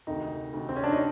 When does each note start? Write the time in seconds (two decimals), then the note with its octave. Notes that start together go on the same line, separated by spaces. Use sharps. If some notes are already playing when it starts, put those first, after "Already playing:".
0.07 D2 C3 D#3 D#4
0.53 D2 C3 D#3
0.69 C4
0.76 C#4
0.83 D4
0.91 D#4